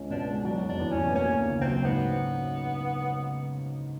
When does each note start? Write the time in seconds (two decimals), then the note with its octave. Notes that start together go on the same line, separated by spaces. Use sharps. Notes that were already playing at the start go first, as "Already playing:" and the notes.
Already playing: C#2 C#4
0.10 B2 D4
0.28 G#3
0.45 F#3 D4
0.63 F1
0.69 D4
0.80 E2
0.92 C#4
0.97 B2
1.15 A#3 C#4
1.32 D2
1.50 C#3
1.61 C4
1.67 F#3
1.85 G#2 B3